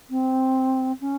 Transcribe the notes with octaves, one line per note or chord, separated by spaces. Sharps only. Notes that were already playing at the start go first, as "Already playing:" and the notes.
C4
C#4